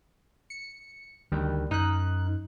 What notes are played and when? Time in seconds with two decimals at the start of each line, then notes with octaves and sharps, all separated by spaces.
0.50 C#7
1.32 D2 D#3 G3
1.71 F#2 D#4 F#6